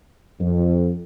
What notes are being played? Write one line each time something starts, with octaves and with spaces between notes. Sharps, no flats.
F2